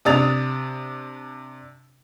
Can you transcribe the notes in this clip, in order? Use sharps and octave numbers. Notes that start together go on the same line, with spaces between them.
C3 D4 D#6 A6 F7